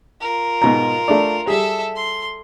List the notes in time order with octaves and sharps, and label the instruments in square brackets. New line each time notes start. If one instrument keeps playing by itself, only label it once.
[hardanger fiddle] F4 A#4
[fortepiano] G#2 B2 A#5
A3 D4 D5
[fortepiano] G3 G#4 [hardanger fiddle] A4 E5
[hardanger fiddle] C6